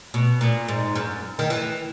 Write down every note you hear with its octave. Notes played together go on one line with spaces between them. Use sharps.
B2
A#2
G#2
F#2
D#3
E3